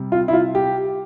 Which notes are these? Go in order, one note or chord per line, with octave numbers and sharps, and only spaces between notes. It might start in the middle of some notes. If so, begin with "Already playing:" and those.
Already playing: C3 G3
F4
E4
F4
G4